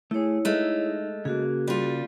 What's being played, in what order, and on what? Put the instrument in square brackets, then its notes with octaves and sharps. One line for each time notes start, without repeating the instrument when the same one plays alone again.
[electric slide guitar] A3 G#4 [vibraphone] E4 C#5
[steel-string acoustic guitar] G#3 A3 [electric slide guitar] D#4
[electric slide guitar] C#3 A#3 [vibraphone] F#4 G#4
[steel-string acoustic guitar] G3 F4